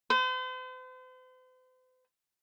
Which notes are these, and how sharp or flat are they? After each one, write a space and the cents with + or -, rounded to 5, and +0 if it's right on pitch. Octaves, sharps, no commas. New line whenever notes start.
C5 -45